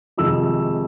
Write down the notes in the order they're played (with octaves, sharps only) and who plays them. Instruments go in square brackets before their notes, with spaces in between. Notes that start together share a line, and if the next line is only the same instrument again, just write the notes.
[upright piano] F2 C3 D#3 G#3 E6